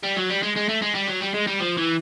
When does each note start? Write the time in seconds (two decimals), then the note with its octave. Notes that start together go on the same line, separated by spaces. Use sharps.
0.03 G3
0.16 F#3
0.29 G3
0.42 G#3
0.56 G#3
0.69 A3
0.82 G#3
0.95 G3
1.08 F#3
1.21 G3
1.34 G#3
1.47 G3
1.60 F3
1.77 E3